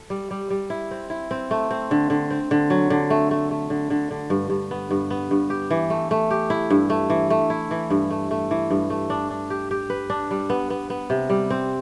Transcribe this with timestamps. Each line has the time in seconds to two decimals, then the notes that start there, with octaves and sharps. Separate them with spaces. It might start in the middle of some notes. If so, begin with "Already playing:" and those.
Already playing: A4
0.10 G3
0.31 G3
0.50 G3
0.70 E4
0.91 C4
1.10 E4
1.31 C4
1.51 A3
1.71 C4
1.91 D3
2.10 D3
2.30 C4
2.51 D3
2.70 F#3
2.90 D3
3.10 A3
3.31 A3
3.51 A3
3.70 D3
3.90 D3
4.11 D3
4.30 G2
4.50 G2
4.71 B3
4.91 G2
5.10 B3
5.31 G2
5.50 G4
5.71 E3
5.90 A3
6.11 A3
6.31 G4
6.50 E4
6.70 G2
6.90 A3
7.10 E3
7.30 A3
7.50 E4
7.71 E3
7.90 G2
8.10 A3
8.31 A3
8.51 E3
8.70 G2
8.90 A3
9.10 D4
9.30 D4
9.50 G4
9.71 G4
9.90 B4
10.10 D4
10.31 G3
10.50 B3
10.70 B3
10.90 B3
11.10 C3
11.30 G3
11.50 C4